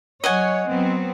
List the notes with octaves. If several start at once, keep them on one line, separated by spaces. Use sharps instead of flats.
F#3 C#5 D#5 F#5 G#5
F#3 B3 C4